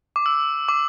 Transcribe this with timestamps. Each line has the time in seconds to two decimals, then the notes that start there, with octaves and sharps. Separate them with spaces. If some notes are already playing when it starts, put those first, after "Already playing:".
0.16 D6
0.26 E6
0.68 D6